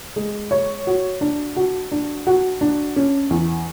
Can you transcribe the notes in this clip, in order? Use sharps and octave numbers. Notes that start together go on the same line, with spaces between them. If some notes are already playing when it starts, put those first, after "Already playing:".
G#3
C#5
F#4
D4
F#4
D4
F#4
D4
C#4
E2